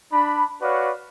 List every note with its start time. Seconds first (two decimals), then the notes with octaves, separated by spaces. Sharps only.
0.13 D4 B5
0.62 F#4 B4 C#5 D5 F5